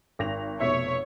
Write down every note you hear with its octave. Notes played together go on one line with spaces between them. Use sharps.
G#1 A#6 F7
F1 B2 C#5 E5